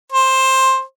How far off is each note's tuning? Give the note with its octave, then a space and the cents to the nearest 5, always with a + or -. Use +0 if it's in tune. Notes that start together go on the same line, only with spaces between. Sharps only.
C5 +10